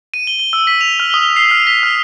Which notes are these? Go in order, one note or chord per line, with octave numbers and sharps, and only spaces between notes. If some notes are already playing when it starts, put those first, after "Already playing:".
D#7
G7
G7
E6
B6
F7
F6
D#6
C7
F6
B6
F6